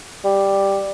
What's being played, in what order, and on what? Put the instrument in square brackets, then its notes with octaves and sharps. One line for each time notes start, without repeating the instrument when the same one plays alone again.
[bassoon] G3